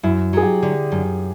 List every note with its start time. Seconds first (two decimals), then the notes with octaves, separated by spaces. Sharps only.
0.03 F#2 E4
0.33 F#3 G#4
0.43 G4
0.63 D3
0.92 F#2